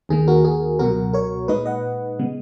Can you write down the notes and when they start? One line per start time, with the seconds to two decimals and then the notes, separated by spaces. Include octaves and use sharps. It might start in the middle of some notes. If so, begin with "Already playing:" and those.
0.09 D#2 D#3 A#3 G#4
0.28 F#4 A#4
0.45 G#4
0.79 C#2 B2 F#3 F#4 A#4
1.13 A#4 C#5
1.48 A#2 G#3 D#4 B4 D#5
1.66 D#5 F#5
2.19 C#3 G#3 B3